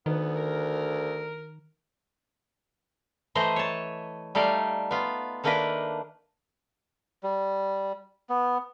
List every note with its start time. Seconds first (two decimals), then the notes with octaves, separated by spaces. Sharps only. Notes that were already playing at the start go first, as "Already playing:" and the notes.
0.06 D2 D#3 B3
0.35 A#4
3.35 E3 A3 C5 D#5 A#5
3.56 C#5 A5
4.35 G3 A3 D#4 D5 F5
4.91 B3 F4
5.44 D#3 A3 A#3 D4 A#4 B4
7.23 G3
8.29 B3